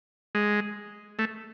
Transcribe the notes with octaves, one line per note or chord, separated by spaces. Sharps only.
G#3
A3